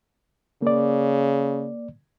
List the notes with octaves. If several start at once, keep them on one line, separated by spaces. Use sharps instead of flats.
C#3 A#3 D5